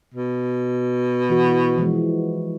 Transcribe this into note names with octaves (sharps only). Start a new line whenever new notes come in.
B2
E3 F#4
E3 F3 G#3